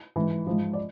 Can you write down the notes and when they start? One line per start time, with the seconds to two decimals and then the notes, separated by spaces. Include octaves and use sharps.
0.16 G#2 E3
0.47 G#2 F3
0.73 D5